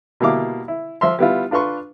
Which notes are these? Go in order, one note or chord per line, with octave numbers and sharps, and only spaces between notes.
B2 G3 A#3 E4 F5 D6
E4
F3 E5 C6
G3 B3 E4 F4
D4 F4 B4 C6 C#6